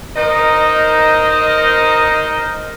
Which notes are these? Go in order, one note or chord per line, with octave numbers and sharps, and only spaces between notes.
D#4 A#4 C5 D#5